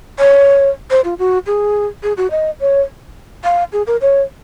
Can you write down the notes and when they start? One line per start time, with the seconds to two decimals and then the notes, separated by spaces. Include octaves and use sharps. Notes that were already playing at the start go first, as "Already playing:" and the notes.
0.19 C#5
0.91 C5
1.04 F4
1.19 F#4
1.46 G#4
2.03 G#4
2.17 F#4
2.31 D#5
2.60 C#5
3.44 F5
3.73 G#4
3.87 A#4
4.02 C#5